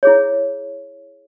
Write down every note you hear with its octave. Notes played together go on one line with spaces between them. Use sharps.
E4 G#4 C#5